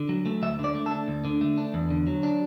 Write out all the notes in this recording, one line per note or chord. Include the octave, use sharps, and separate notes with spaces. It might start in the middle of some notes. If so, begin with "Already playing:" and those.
Already playing: D3
F#3
A3
D2 E5
D3
D5
A3
A4
D4
D2
D3
A3
D4
E2
D3
F#3
D4